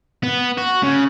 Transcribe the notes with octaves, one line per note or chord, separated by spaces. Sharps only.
B3
F#4
C#3